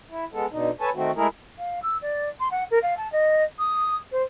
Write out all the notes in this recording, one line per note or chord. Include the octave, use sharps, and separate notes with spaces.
E4
G#3 B3 A4
B2 D3 D#4
A4 B4 C#5 G#5 A5
D#3 A3 C4 F#4
G#3 A3 E4 G#4 A#4
F5
E6
D5
C6
F#5
A#4
F5
A5
D#5
D#6
C5